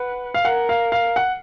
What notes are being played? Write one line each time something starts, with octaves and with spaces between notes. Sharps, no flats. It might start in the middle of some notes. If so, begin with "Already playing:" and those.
Already playing: B4 F#5
F5
A#4 F#5
F5
F5
F#5